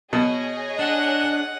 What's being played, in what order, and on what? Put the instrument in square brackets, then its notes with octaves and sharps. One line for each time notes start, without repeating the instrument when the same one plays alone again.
[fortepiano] B2 [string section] G#4 C#5 D#5
[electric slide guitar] D4 [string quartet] F#5